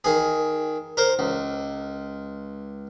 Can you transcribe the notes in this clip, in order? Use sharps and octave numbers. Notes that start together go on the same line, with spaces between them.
D#3 G#4
A#4 C5
C#2